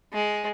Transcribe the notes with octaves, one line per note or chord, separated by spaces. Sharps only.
G#3